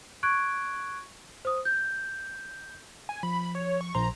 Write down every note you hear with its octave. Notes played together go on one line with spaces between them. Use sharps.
C#6 F#6 G#6 D7
C5 D#6
G6
G#5
F3 B5
C#5
C#6
A#1 C5 A#5 C6